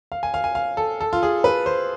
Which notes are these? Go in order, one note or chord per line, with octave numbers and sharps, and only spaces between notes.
F5
G#5
F5
G#5
F5
A4
A4
F4
G#4
B4
C5